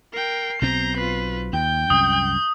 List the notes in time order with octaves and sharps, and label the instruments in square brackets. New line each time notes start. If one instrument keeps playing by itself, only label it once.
[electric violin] A#4 G5 [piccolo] C7
[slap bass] B1 B2 C4 [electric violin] A#5 G6
[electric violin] F4 B4
[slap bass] D#2 [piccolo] G5 [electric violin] G6
[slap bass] C2 F#2 [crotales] D#6